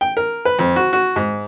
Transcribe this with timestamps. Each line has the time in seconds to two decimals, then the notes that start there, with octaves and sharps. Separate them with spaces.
0.01 G5
0.17 A#4
0.45 B4
0.59 F2
0.76 F#4
0.93 F#4
1.16 G#2